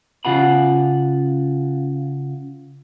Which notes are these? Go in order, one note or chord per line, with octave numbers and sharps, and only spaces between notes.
C#3 F4 F#5 B5